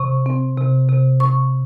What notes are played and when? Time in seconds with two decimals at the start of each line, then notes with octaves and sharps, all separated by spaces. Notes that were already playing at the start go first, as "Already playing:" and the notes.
Already playing: C3 C#6
0.26 C4
0.57 C3
0.89 C3
1.20 C3 C#6